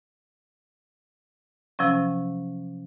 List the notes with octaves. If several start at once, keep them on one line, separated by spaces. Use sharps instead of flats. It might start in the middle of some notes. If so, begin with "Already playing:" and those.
C3 F3 F#3 C#4